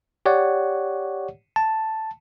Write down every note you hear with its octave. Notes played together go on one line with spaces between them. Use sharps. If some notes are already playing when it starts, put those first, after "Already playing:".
G4 C#5 D5 F#5
A5